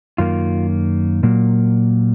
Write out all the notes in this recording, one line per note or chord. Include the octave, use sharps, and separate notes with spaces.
F#2 D#3 A#3 F4
A#2 F#3 A#3